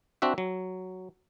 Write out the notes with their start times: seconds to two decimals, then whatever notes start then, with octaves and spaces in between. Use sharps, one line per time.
0.22 C4 D4 F#4 E5
0.38 F#3